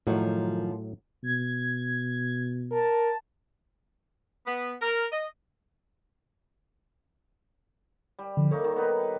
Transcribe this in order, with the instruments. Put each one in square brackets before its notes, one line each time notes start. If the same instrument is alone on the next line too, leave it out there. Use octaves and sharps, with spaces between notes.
[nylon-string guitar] F#2 D#3 F3 [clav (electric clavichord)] A2 F#3
[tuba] B2 [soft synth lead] G#6
[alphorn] A#4 [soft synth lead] A5
[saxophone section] B3
A#4
D#5
[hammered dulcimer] G3
[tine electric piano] D3 F3
[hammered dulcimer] A#3 D#4 C#5 [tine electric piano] A4
[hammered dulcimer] D#3
B3 D#4 B4